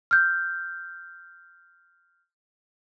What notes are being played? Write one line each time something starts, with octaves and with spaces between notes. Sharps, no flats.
F6 G6